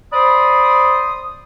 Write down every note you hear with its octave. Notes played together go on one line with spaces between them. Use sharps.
C5 D5 B5 C6 D#6